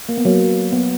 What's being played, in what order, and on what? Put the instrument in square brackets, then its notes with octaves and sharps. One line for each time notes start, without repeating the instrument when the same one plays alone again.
[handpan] A#3
B3
F#3 A#3
B3